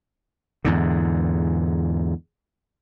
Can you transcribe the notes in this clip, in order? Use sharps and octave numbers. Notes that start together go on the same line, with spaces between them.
E2 G#2 D3